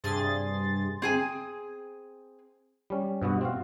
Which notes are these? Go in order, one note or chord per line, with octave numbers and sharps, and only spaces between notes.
G2 C3 G#4 C6 A6
C4 G#4 G#5
G3 C#4
G2 B2 B3 F#4
C4 F#4 F5